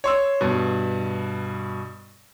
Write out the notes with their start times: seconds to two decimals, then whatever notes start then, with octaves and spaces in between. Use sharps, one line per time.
0.04 C#5 C6 E6
0.41 G2 B2